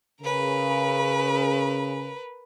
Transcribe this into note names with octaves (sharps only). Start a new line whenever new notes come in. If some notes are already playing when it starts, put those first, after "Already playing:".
C#3 A#4 B4